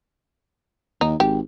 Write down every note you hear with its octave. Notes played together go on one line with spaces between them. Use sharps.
D#2 D#4
G#1 G4